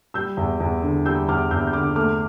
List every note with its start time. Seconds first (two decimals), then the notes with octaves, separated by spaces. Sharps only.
0.14 G3 E6 G6
0.37 E2
0.60 E2
0.83 D3
1.05 G3 E6 G6
1.28 E2 D6 F6
1.51 E2 E6 G6
1.67 G6
1.73 D3 D6 F6
1.96 A3 D6 F6